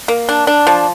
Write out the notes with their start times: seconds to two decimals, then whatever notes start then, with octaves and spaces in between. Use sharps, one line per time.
0.08 A#3
0.29 D4
0.47 D4
0.67 F3